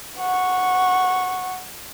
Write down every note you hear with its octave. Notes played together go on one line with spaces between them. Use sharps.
F#5 C#6